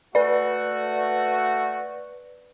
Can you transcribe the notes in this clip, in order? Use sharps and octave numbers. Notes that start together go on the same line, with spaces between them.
A3 F#4 B4 D5